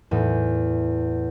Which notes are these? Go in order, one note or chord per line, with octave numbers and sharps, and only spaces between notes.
E2 A2